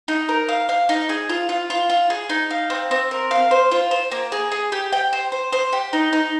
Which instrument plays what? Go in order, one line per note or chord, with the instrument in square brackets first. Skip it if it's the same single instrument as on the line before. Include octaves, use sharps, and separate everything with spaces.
[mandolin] D#4
A#4
F5
F5
D#4
G#4
F4
F4
F4
F4
G#4
D#4
F5
C4
C4
A#4
F5
C5
F4
C5
A#3
G#4
G#4
G4
G5
C5
C5
C5
G4
D#4
D#4